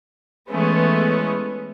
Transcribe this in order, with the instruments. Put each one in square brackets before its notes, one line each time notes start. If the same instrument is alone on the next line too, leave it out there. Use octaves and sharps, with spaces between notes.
[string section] E3 G#3 A3 B3 C#4